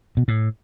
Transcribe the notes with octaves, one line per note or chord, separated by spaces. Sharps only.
B2
A2